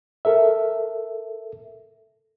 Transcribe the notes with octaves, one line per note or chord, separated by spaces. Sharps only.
A4 A#4 E5